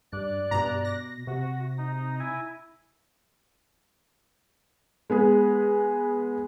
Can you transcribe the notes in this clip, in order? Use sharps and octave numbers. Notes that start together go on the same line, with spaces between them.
G2 D5 F#6
G2 B2 A#5
A#6
C3 F#4
D#4
E4 G#5
G#3 B3 G#4